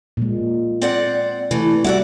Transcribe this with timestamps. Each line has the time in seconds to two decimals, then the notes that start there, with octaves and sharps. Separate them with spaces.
0.17 A#2 G#3
0.82 C4 D5 F#5
1.51 C3 E3 A3
1.84 G3 E4 F#4 D5 E5 F#5